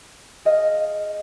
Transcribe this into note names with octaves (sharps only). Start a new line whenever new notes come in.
G#4 D#5 F5